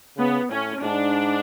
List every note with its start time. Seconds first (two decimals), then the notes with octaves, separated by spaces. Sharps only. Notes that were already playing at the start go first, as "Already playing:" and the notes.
0.17 C#3 B3
0.49 A2 C#4
0.82 G#2 D4